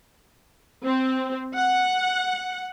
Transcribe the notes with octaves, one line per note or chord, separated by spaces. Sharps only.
C4
F#5